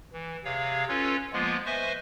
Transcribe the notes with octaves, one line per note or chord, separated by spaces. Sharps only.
E3
C3 G#4 C#5 F5
C#4 F4 A4 B4 C#5
F3 G#3 A#3 B3 F4
B4 C5 D#5 E5 G#5 C#6